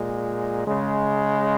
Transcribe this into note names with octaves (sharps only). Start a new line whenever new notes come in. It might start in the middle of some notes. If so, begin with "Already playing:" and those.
Already playing: A#2 G#3
C#3 G#3